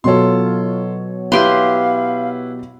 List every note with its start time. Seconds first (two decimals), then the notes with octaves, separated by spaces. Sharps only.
0.04 B2 F#3 F4 A4 C#5 C6
1.32 E4 G4 B4 F5 C6